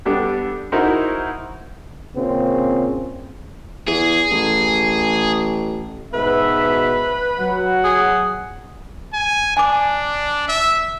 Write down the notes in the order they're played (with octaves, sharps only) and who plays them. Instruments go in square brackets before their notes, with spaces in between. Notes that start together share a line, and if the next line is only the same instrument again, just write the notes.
[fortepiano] G3 B3 D4 G4 A4
D#4 E4 F#4 G#4 A#4 C5
[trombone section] A#2 C#3 C4
[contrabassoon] E2 [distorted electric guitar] G#4
[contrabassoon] A1
[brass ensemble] G#2 B2 E5 [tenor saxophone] B4
[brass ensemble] F#3 F#4 F#5
[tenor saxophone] G#4
[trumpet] G#5
[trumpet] D4 [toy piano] G#5 D6
[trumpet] E5